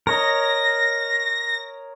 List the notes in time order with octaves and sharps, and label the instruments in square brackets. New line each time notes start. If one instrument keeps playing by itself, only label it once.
[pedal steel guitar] A#4 C#5 D#5 [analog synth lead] A#6